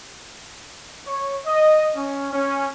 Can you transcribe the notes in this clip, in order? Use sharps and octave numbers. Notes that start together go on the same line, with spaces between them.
C#5
D#5
C#4
C#4